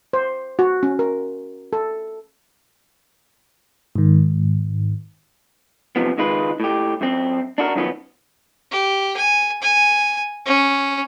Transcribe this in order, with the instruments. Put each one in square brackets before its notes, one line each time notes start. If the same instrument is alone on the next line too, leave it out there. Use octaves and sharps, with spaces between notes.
[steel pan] C5
F#4
C#4
A#4
A4
[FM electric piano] G#2 D#3
[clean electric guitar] F#2 C3 F3 B3
C#2 D#3 G#3 F4 B4
A2 G4
F#2 C4
D4 E4 F#4 A#4
F#2 D#3 F3 F#3 B3 C#4
[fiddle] G4
G#5
G#5
C#4